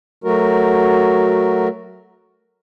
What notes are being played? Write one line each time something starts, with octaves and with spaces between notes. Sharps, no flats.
F#3 A3 F#4 A#4